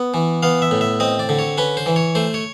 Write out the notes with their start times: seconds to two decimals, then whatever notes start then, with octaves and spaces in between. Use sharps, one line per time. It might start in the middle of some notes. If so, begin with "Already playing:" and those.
Already playing: B3
0.14 E3
0.43 B3 F5
0.62 E5
0.71 A2
0.81 E5
1.00 C4 D#5
1.19 D5
1.29 D3
1.39 C#5
1.58 C#4 B4
1.77 C5
1.86 E3
1.96 C#5
2.15 A3 C5
2.34 C#5